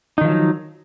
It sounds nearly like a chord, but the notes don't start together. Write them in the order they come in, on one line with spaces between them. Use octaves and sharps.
D#4 D#3 F3 F#3